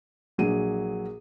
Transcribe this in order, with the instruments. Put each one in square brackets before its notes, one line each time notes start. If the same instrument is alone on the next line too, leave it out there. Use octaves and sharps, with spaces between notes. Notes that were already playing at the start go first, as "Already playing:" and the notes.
[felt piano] A#1 F#3 G#4 D#7